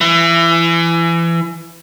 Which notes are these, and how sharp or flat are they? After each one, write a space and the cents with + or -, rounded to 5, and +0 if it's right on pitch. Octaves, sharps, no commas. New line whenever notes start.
E3 +25